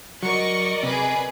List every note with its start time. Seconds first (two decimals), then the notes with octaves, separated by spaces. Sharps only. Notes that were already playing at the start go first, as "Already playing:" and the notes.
0.23 F#3 A#4 D5 D#5 C#6
0.83 C3 G#4 B4